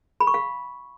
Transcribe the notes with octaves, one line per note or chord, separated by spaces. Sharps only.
B5
C#6
F5